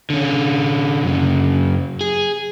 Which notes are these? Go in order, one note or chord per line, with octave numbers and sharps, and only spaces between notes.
D3 C#4
F#2 C#3
G#4